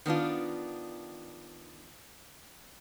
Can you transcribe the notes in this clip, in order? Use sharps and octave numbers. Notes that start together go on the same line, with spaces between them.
D#3 B3 D4 F4